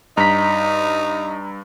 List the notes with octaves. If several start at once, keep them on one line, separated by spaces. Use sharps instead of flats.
G2 D#4 A#5 B6